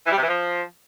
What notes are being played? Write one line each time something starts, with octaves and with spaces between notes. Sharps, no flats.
E3
G3
C3
E3
F3